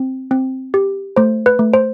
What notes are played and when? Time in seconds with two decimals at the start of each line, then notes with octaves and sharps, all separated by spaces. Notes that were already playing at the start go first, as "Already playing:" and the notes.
Already playing: C4
0.31 C4
0.74 G4
1.16 A3 C5
1.46 B4
1.59 A3
1.74 C5